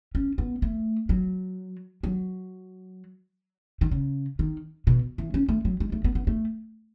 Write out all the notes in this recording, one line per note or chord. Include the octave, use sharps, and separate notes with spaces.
C#4
B3
A3
F#3
F#3
D#3
C#3
D#3
B2
E3
C#4
A3
F#3
G#3
A3
B3
B3
A3